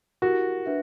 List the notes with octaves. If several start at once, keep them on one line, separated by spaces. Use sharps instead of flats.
E4 F#4 G4 A#4
D4 B4 E5